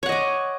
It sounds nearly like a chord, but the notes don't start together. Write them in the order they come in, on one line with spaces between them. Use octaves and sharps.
C#5 F#5 D#5 D6